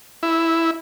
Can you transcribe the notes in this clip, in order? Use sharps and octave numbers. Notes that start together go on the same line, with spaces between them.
E4